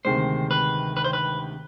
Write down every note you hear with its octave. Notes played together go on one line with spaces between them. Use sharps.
D2 C3 D#3 G#3 C5
B4
B4
C5
B4